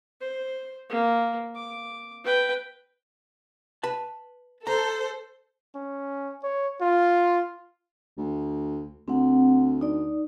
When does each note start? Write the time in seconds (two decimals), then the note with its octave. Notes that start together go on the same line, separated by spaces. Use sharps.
0.21 C5
0.90 A#3
1.55 D6
2.24 B4 G5
3.83 B4 A5
4.67 A4 C5 A#5
5.75 C#4
6.43 C#5
6.81 F4
8.17 D2
9.08 D2 C4 F#5
9.81 D#4 D5